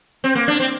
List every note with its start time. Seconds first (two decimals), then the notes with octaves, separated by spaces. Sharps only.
0.24 C4
0.35 A#3
0.48 D4
0.60 C4